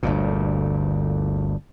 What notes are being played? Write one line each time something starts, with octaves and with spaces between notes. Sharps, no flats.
G1 D2 A#2